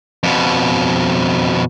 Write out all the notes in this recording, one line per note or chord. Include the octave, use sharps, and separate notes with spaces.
F2 B2